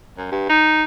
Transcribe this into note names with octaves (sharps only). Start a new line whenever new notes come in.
F#2
G2
D#4